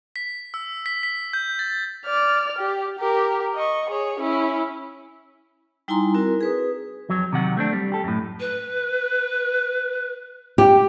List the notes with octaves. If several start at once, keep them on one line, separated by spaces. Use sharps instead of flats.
B6
E6
B6
B6
G6
A6
D5 F6
G4
G4 A#4
D#5 C#6
G#4 C#5
C#4 E4
G3 D#4 E4 G#5 A#5 C6
C4 E4 F#4 A#4
G#4 B4 D#6
F2 F#3
C3 D#3 F#3 F#5
A3 C4 D4
G3
G4 A4
F#2 A2
B4
G4